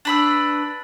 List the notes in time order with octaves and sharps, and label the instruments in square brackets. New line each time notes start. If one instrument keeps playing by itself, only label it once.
[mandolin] D4 B4 E6